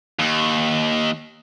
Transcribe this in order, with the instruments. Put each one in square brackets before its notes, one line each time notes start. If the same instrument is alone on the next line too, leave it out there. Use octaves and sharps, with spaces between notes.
[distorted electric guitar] D#2